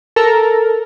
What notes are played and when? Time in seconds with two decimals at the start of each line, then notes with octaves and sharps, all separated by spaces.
0.16 A4 A#4 A#5